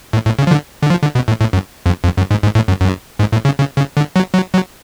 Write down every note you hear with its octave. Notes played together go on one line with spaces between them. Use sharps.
A2
A2
C#3
F3
D3
D3
F3
D3
B2
A2
A2
F#2
F2
F2
F#2
G#2
G#2
A2
F#2
F#2
G#2
A2
C#3
C#3
C#3
D3
F#3
F#3
F#3